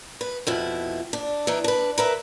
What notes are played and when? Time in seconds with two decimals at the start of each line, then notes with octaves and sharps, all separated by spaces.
0.21 B4
0.47 F2 B2 E4
1.13 D4
1.47 E3 D4 D#4
1.64 D4 B4
1.98 A#4 B4 E5